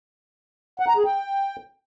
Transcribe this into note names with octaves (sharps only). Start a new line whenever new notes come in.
F#5
A#5
G#4
G5